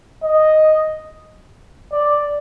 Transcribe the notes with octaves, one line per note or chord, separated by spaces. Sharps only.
D#5
D5